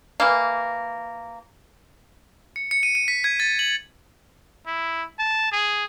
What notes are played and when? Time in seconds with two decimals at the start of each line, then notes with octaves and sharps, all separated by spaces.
0.20 E3 A#3
2.56 C#7
2.71 C#7
2.83 D#7
2.95 D#7
3.08 B6
3.24 G#6
3.40 A6
3.59 F#7
4.67 E4
5.19 A5
5.52 G#4